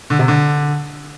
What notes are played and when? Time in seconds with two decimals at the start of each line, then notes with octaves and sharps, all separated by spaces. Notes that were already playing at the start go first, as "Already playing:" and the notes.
0.10 D3
0.19 C3
0.28 D3